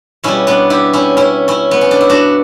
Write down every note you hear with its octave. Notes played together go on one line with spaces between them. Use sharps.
B2 G3 C#4 E4
B3 D4
E4 G4
C#4 E4
C#4 E4
C#4 E4
B3
C#4
D4
E4
D4 F#4